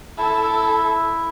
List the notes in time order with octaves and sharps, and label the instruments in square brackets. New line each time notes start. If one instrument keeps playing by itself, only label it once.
[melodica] E4 E5 [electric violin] A4